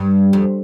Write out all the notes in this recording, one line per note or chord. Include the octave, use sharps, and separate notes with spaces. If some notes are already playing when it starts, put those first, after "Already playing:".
Already playing: G2
F2